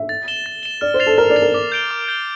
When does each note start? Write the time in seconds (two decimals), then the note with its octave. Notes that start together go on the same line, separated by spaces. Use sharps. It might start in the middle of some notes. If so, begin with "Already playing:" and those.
Already playing: E5
0.09 A6
0.28 E7 G7
0.46 A6
0.63 E7 G7
0.81 D5 F6
0.94 C5
1.00 A6 C7 F7
1.06 A4
1.18 A#4 F6
1.30 D5
1.36 A6 C7 F7
1.42 A#4
1.54 D6
1.72 G6 D7 G7
1.91 D6
2.08 G6 D7 G7